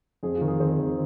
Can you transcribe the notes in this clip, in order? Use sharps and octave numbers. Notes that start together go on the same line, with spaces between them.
F2 G#4
F4
D#3
G#4
C4 C5
D#3